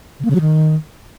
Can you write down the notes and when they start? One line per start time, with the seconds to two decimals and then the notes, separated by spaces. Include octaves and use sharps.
0.20 C#3
0.25 A#3
0.30 C#3
0.35 F#3
0.41 D#3